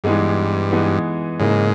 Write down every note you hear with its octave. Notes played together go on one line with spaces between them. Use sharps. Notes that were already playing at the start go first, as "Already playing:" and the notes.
G2 E3 G#3 B3 D#4 G#4
E3 G#3 B3 D#4 G#4
G#2 C#3 E3 A#3 D#4